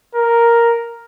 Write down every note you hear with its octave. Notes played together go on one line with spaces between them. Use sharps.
A#4